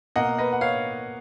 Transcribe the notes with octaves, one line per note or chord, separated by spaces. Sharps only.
B2 A#3 D#5 F#5
B4 D#5
F#5
C#5 F5